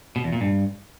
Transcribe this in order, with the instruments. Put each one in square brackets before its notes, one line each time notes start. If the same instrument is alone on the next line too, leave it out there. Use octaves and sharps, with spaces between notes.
[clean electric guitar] B2
E2
A#2
G2